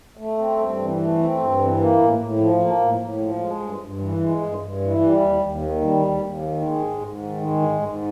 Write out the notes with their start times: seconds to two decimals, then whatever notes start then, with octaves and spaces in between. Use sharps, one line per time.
0.17 A3
0.38 C4
0.59 G2
0.79 E3
0.98 A3
1.18 C4
1.38 G2
1.58 E3
1.78 A#3
1.98 A2
2.19 A2
2.40 F3
2.59 A#3
2.79 A2
3.00 A2
3.19 F3
3.40 G#3
3.60 G2
3.79 G2
4.00 E3
4.21 G#3
4.41 G2
4.60 G2
4.80 E3
5.01 G3
5.21 D#2
5.42 D#2
5.62 D#3
5.81 G3
6.02 D#2
6.22 D#2
6.41 D#3
6.62 G#3
6.82 G#2
7.02 G#2
7.23 D#3
7.42 G#3
7.62 G#2
7.83 G#2